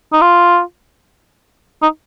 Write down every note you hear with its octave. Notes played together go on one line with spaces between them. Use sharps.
D#4
F4
D#4